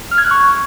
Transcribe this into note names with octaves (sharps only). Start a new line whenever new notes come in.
F6
G#6
F#6
C#6